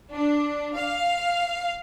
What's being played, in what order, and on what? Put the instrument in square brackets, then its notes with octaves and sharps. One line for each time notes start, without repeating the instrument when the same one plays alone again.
[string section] D4
F5